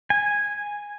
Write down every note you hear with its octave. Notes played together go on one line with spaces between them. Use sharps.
G#5